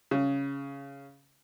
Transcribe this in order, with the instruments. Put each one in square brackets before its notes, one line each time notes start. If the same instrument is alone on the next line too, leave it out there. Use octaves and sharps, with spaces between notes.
[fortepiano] C#3